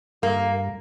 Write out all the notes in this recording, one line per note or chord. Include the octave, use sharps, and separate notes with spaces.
G2 A#3